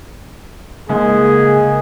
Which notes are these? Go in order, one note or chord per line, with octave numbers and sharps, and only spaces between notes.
G#2 C#3 A#3 G#4